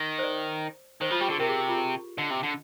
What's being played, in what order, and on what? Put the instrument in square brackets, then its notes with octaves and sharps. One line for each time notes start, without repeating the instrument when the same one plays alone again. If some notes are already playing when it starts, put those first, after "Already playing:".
Already playing: [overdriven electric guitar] D#3
[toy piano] C5
D5
[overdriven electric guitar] D#3 [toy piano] C5
[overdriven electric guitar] F3 [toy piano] F4
[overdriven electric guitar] G3 [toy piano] G4
[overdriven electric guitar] D3 [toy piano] G#4
[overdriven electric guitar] C3 [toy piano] A#4
[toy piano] G#4
G4
F4
G4
[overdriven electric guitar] D3 [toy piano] D#5
[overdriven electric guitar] C3
D3